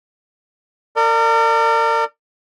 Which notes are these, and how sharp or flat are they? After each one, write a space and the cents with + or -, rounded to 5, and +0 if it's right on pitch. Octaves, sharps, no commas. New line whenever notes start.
A#4 -35 D5 +20